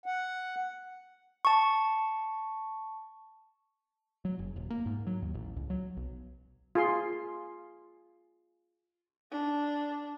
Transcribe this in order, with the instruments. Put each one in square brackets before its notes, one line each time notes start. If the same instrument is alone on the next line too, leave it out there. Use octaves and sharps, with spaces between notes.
[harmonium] F#5
[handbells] A5 C#6
[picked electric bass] F#3
F#1
D#1
A#3
G#2
F#3
D#2
A1
C#2
F#3
B1
[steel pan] F4 G#4 C6
[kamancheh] D4